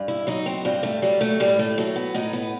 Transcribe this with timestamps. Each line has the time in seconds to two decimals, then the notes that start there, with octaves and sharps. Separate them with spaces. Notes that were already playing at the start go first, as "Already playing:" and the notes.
Already playing: G2
0.08 E4
0.27 F#3 D#4
0.46 C4
0.65 G2 C4
0.83 A3
1.02 F#3 G3
1.21 A3
1.40 A2 G3
1.59 A3
1.78 F#3 A3
1.96 B3
2.14 A2 D#4
2.33 B3